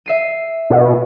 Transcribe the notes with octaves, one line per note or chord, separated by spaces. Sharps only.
E5 C7 D#7
B2